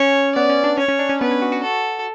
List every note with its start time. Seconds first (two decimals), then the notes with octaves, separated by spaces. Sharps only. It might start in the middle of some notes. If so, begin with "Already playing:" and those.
Already playing: C#4 C#5
0.35 B3 D5
0.49 C#4
0.64 D4
0.78 C#4 C#5
0.88 C#4
0.99 D4
1.09 C#4
1.21 B3 B4
1.31 C#4
1.42 F#4
1.52 F#4
1.63 A4